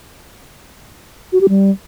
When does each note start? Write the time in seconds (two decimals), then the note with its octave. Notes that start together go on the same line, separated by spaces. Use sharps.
1.32 F#4
1.41 G4
1.49 G3